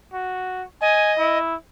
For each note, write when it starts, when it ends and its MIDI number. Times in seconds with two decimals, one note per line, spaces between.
0.13 0.64 66
0.81 1.38 75
0.81 1.13 80
1.19 1.55 64